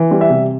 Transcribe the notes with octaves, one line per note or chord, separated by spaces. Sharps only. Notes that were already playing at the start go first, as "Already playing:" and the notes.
Already playing: E3
G3
E5
C3